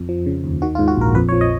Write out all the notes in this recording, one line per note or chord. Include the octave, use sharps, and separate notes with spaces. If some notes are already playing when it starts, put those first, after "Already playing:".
Already playing: F2
F3
C#3
D#2
D#3 F#4
F4
G#2
F#4
A#1 A#4
F2 B4
C#5
F3
D#5